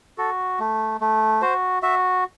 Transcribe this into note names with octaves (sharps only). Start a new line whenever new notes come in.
F#4 A4
A3
A3
F#4 C5
F#4 E5